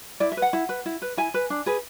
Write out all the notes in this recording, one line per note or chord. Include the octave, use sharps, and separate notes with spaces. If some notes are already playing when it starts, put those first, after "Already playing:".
E4 D5
E5
B4
F#5
E4
B4
E4
B4
E4 G#5
B4
D4
G#4 B4